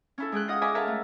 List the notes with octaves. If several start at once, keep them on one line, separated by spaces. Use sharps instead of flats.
C#4 E4 A4
G#3 G#4 G5 F#6
F4 D#5 F#5 D#6
C#5 D#5 E5 G#5 B5 D6
A4 A#4 C#5 E5 F#5 A5
A3